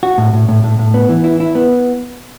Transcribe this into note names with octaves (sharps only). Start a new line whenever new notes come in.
F#4
A2
A2
A2
A2
A2
B3
E3
E4
E4
B3